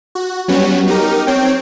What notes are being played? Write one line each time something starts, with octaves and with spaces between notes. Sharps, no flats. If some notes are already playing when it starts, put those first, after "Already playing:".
F#4
F#3 G3 B3 C#4 F#4
D#4 G4 A#4
C4 C#5 G5